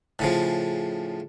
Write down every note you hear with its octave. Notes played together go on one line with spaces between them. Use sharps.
A2 C#3 F3